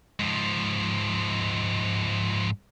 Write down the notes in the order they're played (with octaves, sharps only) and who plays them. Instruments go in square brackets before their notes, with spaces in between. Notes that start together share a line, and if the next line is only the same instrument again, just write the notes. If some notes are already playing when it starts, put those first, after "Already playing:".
[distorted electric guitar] G#2 F3